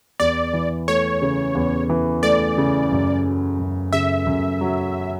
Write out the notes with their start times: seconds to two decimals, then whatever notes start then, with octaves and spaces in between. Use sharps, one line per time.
0.19 E2 D5
0.53 E3
0.88 A3 C#5
1.22 C#3
1.55 E2
1.90 E3
2.23 A3 D5
2.57 C#3
2.92 F#2
3.25 F#3
3.59 F#2
3.93 C#3 E5
4.26 F#2
4.61 F#3